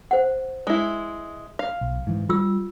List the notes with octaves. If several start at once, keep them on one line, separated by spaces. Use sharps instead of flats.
C5 F#5
G#3 E4
F5
B1
G#2 E3
G3 F4 E6